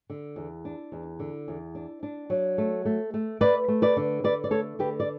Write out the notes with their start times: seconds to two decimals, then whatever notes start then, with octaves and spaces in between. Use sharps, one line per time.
0.10 D3
0.36 E2
0.65 D4
0.92 E2
1.19 D3
1.48 E2
1.75 D4
2.03 D4
2.30 F#3
2.58 A3
2.85 A3
3.14 A3
3.40 A3 B4 D5
3.68 A3
3.82 B4 D5
3.97 D3
4.24 D3 B4 D5
4.44 D5
4.51 A3 A4 C#5
4.79 D3 G4 B4
5.00 D5